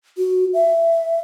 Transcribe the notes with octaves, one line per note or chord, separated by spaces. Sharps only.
F#4
E5